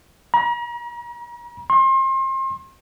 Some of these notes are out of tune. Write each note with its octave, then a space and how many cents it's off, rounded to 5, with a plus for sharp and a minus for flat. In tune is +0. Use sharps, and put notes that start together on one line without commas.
A#5 +40
C6 +35